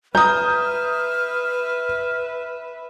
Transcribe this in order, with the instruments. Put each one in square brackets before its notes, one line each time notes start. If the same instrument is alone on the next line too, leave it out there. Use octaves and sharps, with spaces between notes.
[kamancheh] B4 E5 [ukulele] A#5 [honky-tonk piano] D#6 G6 [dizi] F6